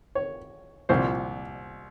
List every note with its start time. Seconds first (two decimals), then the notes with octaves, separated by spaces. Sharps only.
0.15 C#5
0.89 C2 A#2 F3 C5